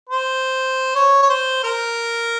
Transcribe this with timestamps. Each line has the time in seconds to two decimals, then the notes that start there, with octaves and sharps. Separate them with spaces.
0.09 C5
0.95 C#5
1.22 C#5
1.29 C5
1.64 A#4